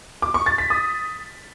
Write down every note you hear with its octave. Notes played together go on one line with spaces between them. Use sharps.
D6
C#6
A6
B6
D#6